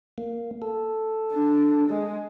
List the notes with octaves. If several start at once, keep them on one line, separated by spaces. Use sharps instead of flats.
A#3
A4
D4
G#3